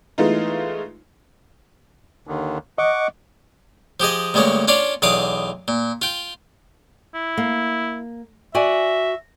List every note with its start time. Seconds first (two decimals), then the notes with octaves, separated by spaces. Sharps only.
0.18 E3 G#3 A3 B3 D#4 F4
2.27 D#2 D3 D#3
2.78 D#5 F#5 C#6 D6
4.00 F3 G4 G#4 D#5
4.34 D2 G2 G#3 A#3 C#4
4.68 C#4 D4 F4 D5 F5
5.02 B1 E2 D4 F5 D6 D#6
5.68 A#2
6.02 F4 G5
7.14 E4
7.37 A#3
8.55 F#4 D5 E5 G#5